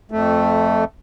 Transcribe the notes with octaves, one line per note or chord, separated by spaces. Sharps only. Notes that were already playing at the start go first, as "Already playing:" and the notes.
F2 A3